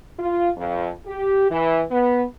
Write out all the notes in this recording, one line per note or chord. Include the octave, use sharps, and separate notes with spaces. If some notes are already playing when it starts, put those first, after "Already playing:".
F4
F2
G4
E3
B3